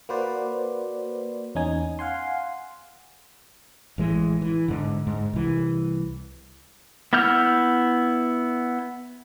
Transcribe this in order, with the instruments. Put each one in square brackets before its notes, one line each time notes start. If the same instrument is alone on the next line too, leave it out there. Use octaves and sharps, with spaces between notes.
[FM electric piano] A#3 F#4 B4 C5 D5
E2 C#4 D#4 G#5
F5 F#5 G#5 C6
[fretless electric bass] A1 E3 G#3
E3
G#2 D3
G#2
C2 E3
[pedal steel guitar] B3 E4 E6 F6 G6